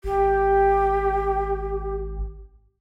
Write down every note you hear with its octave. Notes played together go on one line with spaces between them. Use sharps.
G#1 G4